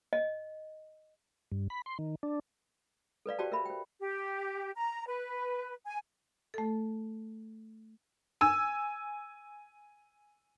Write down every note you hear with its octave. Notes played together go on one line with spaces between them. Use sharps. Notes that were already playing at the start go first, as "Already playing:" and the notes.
D#5
G2
B5
C6
D#3
D4
A4 B4 D5 F5
F#4 G4 C5 D5 G5 A5
A#4 E5 B5
C5 G5
G4
A#5
B4
G#5
A3 A4
G#5 E6